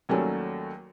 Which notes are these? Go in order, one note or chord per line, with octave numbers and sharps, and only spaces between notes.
D#2 F#3 G3 A3 C#4 G#5